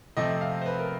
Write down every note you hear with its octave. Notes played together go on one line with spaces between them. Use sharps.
C3 F3 A3 C4 D#5
F5
C5
B4
A#4